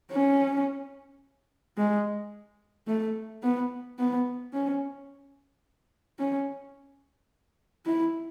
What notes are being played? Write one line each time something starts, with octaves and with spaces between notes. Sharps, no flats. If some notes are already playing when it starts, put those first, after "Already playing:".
C#4
G#3
A3
B3
B3
C#4
C#4
E4